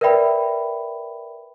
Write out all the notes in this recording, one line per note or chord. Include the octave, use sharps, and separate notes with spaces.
A#4 B4 D5 E5 G5 B5